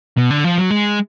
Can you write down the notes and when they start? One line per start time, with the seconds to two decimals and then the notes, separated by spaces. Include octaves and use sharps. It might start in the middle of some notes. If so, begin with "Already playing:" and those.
0.17 B2
0.31 D3
0.44 F3
0.58 F#3
0.71 G#3